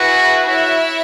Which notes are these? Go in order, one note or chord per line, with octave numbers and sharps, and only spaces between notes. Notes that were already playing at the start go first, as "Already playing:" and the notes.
Already playing: E4 F#4 G#4 B4 F#5
E4 F#4 C#5 E5